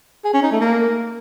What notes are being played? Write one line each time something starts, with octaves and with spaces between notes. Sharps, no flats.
G#4
C#4
D#4
A3
A#3